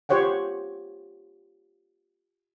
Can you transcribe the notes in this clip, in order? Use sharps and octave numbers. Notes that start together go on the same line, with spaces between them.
F4 G4 C5 C#5 F#5 G5